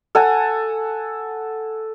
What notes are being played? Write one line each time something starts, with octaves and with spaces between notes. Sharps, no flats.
A4 F#5 G#5